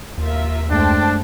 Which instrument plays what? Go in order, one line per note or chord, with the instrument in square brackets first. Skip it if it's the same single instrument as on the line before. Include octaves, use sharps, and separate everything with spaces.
[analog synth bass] D#2 [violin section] F4 A#4 E5
[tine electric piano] F#2 G#3 A3 [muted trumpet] D4 [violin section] C5 G5 A5